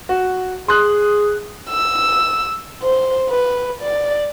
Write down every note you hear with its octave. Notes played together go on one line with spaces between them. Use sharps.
F#4
G#4 C6 D#6 F#6
E6
C5
B4
D5